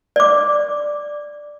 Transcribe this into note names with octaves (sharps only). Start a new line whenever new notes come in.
D5 D6